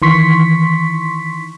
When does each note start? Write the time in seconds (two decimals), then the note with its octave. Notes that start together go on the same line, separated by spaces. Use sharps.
0.02 D#3 E3 C6 C#6 B6